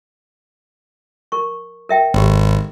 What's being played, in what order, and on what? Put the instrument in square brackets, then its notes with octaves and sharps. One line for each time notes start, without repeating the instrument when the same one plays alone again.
[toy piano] A#4 C#6
A#4 E5 G5
[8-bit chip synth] G#1 [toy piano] G4 A4